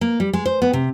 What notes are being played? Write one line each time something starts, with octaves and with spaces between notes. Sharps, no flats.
A#3
G3
G#3
C5
B3
C3